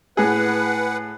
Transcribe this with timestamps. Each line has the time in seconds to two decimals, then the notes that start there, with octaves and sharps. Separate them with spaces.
0.17 A2 G#4 B4 F#5